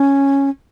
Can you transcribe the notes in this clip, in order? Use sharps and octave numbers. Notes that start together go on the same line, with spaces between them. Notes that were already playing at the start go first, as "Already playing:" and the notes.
Already playing: C#4